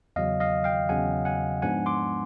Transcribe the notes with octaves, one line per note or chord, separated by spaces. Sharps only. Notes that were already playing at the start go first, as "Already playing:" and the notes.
E2 C#3 F#3 D#5 F5
D#5 F5
F5 G5
E2 C#3 F#3 F#5 G#5
F#5 G#5
G#2 F3 G#3 B3 D4 F#5 G#5
C6 D6